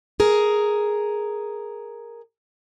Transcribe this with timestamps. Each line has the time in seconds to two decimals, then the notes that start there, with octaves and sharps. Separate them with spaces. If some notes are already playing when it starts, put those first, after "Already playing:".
0.20 G#4 A#4